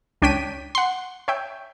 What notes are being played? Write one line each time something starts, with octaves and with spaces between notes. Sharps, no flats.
C#2 D4 C#5 G5 B6 D#7
F#5 C6
C#5 E5 G5